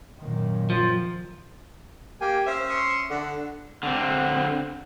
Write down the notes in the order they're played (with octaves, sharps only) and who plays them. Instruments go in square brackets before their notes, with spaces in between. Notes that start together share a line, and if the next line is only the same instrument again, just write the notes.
[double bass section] F#2 A#2 D#3
[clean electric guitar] F3
[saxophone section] A#3 [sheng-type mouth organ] G4 G5 G#5
[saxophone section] C#4 E5 [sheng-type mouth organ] C5
[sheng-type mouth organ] C6 C#6 D#6
[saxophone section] D3 [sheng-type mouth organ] F#5
[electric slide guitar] D3 C4